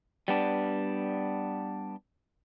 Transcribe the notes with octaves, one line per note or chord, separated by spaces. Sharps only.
G3 B3 D4